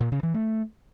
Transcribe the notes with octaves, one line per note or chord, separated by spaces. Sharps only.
A#2
C#3
E3
A3